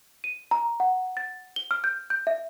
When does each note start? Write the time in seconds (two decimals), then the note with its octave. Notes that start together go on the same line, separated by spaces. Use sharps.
0.24 D#7
0.51 A#5
0.80 F#5
1.17 A6
1.56 G7
1.71 F6
1.84 G6
2.10 G6
2.27 E5